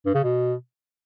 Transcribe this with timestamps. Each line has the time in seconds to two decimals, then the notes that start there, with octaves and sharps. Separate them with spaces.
0.06 G2
0.15 C#3
0.23 B2